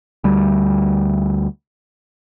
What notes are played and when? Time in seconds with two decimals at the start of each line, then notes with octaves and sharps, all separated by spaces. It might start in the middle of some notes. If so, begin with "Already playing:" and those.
0.24 D2 G3